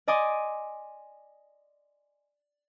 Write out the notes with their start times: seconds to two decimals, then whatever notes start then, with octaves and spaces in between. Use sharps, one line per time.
0.08 D5 D#5 G#5 C6 D6